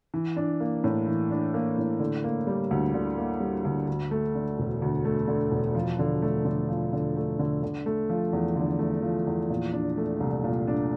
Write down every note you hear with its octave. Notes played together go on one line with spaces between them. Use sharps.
E3
D4
A#3
A2
E3
D4
A#3
A2
D3
A#3
G3
D2
D3
A#3
G3
D2
D2
A3
D3
E1
D2
A3
D3
E1
F3
D3
A3
D3
F3
D3
A3
D3
D3
A3
F3
E2
D3
A3
F3
E2
A#2
D4
A3
C2
A#2
D4